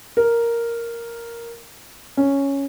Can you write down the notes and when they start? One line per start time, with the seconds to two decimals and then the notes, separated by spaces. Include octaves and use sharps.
0.17 A#4
2.17 C#4